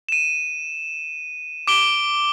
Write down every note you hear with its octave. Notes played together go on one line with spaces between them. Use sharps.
D#7 E7
D6 D7 G7